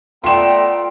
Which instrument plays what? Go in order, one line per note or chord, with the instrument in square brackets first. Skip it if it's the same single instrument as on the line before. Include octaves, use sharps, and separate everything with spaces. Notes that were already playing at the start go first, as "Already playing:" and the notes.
[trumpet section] A3 B3 A#5 [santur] F4 D5 [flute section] G5 [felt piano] C6 E7